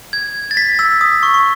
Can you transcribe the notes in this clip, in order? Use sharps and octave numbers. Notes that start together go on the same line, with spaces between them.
G#6
A6
B6
E6
D#6
C#6
C#6